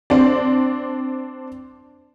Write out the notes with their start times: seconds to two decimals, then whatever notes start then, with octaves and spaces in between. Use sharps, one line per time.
0.10 C4 D4 D5